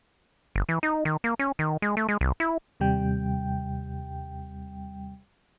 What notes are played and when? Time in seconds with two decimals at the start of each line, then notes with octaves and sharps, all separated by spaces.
0.56 G1
0.69 E3
0.83 D#4
1.05 D#3
1.24 A#3
1.39 C#4
1.59 D#3
1.82 G#3
1.97 A3
2.09 G#3
2.21 C2
2.40 E4
2.80 D#2 C3 G3 G5